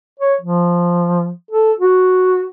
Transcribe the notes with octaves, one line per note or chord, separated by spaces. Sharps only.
C#5
F3
A4
F#4